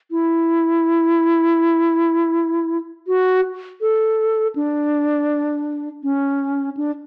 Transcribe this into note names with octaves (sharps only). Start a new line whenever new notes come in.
E4
F#4
A4
D4
C#4
D4